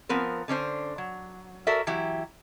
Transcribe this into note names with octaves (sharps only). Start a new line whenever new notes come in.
F3 B3 C4 A#4
D3 C#4 D4 C5
F#3
F#4 A4 A#4 D5 E5
E3 F#3 E4 G4